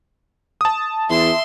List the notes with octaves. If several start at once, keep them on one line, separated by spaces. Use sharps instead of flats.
A5 D#6
E2 E5 C6